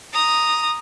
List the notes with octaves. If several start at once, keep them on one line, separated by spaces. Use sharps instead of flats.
A#5 D#6